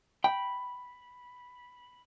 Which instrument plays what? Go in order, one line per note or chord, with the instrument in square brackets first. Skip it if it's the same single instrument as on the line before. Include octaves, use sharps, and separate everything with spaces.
[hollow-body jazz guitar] G5 [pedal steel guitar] B5